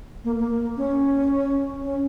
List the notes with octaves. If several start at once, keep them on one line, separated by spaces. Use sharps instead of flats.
A#3
A#3
C#4
C#4